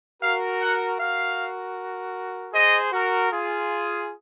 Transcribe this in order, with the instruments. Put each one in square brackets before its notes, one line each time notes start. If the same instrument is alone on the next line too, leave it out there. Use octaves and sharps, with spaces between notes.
[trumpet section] F#4 A#4 [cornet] F5
[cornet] F#5
[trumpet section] F#4 A#4 [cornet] F5
[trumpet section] G#4 C5 [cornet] D#5
[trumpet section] F#4 A#4
F4 G#4